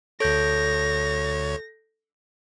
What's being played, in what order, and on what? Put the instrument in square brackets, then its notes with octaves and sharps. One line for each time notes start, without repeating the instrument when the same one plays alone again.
[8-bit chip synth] D2 C#5 [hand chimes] A4 G6 [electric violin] A#6